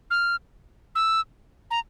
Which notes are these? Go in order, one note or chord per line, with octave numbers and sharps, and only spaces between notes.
F6
E6
A#5